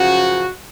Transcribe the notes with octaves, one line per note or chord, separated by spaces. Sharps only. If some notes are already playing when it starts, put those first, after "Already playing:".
Already playing: F#2 C#3 F3 F#4